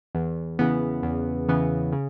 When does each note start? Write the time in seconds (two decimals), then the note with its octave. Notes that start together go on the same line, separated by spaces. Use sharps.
0.15 E2
0.59 C#3 E3 B3
1.03 E2
1.48 C#3 E3 B3
1.93 C#3